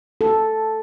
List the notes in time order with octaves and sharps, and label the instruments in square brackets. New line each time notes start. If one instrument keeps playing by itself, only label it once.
[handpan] A4